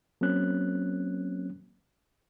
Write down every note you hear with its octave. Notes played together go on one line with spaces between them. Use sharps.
F#3 A#3 C4 C#4 F#6